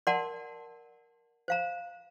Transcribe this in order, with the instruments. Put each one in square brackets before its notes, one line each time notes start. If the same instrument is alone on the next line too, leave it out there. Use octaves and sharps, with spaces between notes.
[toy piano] A#4 D5 F#5 A5 C6
C5 F5 A#5